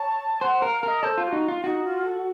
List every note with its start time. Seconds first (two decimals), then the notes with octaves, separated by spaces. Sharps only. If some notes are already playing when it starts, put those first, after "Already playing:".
Already playing: C#5 A5
0.41 C5 F#5
0.62 A#4 F5
0.83 A#4 D#5 F5
1.03 A4 C5
1.18 F4
1.24 A4
1.27 F#4
1.33 D#4
1.48 F4
1.63 D#4 F#4
1.84 F4
2.04 A4